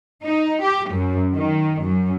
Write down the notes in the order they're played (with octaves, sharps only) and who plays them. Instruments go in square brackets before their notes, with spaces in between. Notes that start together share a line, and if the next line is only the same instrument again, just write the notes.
[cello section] D#4
G4
F#2
D#3
F#2